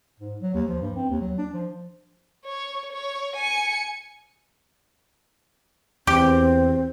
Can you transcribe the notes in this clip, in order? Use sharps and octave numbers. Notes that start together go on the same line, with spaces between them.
G#2
F#3
D#2
F3
G2
C4
D#2
F#3
D4
F3
C#5
C#5
G#5 C#7
E2 C4 G4